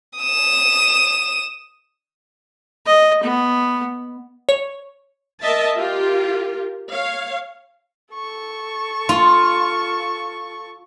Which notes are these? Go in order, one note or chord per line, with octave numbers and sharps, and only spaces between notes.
D#6 E7
D#5
B3
C#5
A#4 D#5 E5 A5
F4 G4 A#4
C#5 F5
A4 C#6
F4